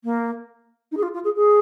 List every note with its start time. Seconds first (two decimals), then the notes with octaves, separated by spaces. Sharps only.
0.04 A#3
0.91 D#4
0.97 G#4
1.02 F4
1.13 F4
1.24 G#4
1.35 G#4